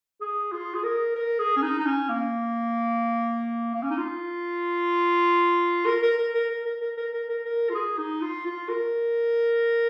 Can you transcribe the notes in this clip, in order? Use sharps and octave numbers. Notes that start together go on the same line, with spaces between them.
G#4
F4
G#4
A#4
A#4
G#4
C#4
D#4
D#4
C#4
A#3
A#3
C#4
D#4
F4
A#4
A#4
A#4
A#4
A#4
A#4
A#4
A#4
A#4
A#4
A#4
F4
G#4
D#4
F4
F4
A#4